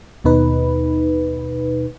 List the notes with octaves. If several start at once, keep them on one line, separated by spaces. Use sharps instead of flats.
D#2 B2 D#4 B4